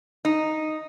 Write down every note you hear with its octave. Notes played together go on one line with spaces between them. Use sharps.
D#4